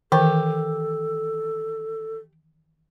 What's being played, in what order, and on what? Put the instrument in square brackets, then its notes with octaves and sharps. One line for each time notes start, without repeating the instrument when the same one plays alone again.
[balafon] D#3 E3 [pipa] G4 [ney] A4